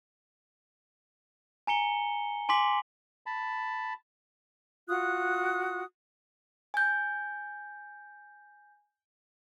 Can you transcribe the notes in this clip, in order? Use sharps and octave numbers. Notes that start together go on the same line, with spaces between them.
G#5 A#5 C#7 G7
G#5 C6 D6 B6 F#7
A5 B5
F4 F#4 D#6 F#6
G#5 G6